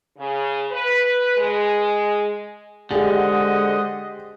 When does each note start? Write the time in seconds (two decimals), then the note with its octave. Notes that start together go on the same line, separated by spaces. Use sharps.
0.16 C#3
0.72 B4
1.38 G#3
2.91 D3 G#3 G4 G#4 C5 D#5 F#5